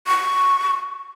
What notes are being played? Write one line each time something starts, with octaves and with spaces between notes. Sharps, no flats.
C#6